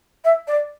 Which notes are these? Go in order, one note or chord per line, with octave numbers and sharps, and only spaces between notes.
E5
D5